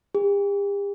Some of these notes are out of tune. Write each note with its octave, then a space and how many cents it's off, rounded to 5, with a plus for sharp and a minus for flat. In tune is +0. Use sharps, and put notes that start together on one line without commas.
G4 +45